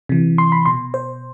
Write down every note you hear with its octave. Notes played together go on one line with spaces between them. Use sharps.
C3 E3
C6
B5
B2 C6
C5